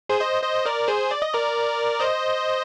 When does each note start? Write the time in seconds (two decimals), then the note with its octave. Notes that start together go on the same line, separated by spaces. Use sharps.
0.09 G#4 C5
0.21 C5 D#5
0.43 C5 D#5
0.65 A#4 D5
0.88 G#4 C5
1.11 D5
1.22 D#5
1.34 A#4 D5
2.00 C5 D#5